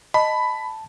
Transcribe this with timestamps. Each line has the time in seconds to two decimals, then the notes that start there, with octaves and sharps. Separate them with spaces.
0.14 D#5 A5 B5